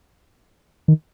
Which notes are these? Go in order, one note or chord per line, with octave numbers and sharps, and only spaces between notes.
D#3